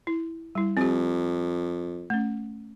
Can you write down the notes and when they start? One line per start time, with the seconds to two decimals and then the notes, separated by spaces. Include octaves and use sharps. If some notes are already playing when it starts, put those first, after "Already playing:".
0.07 E4
0.55 G3 E4
0.77 F2 C4 G4
2.10 A3 C#4